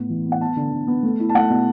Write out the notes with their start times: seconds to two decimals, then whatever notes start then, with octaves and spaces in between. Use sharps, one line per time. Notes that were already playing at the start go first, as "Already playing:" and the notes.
Already playing: A2 B3
0.10 E3
0.26 B3
0.32 F#5
0.41 B3 A5
0.56 D3
0.72 D3
0.87 B3
1.03 A3
1.20 E4
1.29 A5
1.35 A3 F#5
1.50 B2